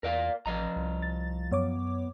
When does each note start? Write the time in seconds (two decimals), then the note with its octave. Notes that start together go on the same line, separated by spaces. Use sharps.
0.03 E2 A#4 D5 F5
0.46 A1 F3 D#5 A#5
0.76 C2
1.02 A6
1.51 F#2 B3 C#5 D6